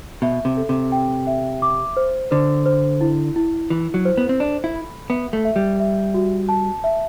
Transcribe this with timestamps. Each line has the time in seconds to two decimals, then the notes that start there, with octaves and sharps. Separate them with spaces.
0.22 B2 E5
0.45 C3
0.57 A4
0.69 C3
0.92 G5
1.27 E5
1.62 D6
1.97 C5
2.31 D3 C5
2.66 C5
3.01 E4
3.36 E4
3.70 E3 E4
3.94 F#3
4.05 C5
4.17 B3
4.29 C4
4.40 D4 A4
4.64 E4
4.75 B5
5.10 B3 E5
5.33 A3
5.45 E5
5.56 G3
5.80 E5
6.14 F#4
6.49 A5
6.84 E5